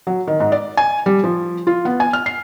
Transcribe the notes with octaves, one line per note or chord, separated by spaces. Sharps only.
F#3
D#3
G#2
D5
G#5
G3
F3
F4
B3
G#5
F6
C7